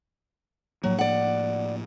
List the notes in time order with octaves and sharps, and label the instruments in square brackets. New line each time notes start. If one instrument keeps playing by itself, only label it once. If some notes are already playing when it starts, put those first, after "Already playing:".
[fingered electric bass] A2 F3 A#3 [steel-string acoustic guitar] F#3
[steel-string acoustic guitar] D5 F#5